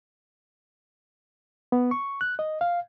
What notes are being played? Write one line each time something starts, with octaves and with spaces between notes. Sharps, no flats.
B3
C#6
F#6
D#5
F5